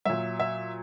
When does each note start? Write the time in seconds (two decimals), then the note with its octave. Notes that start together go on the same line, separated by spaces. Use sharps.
0.05 A#2 F#3 E5
0.40 E5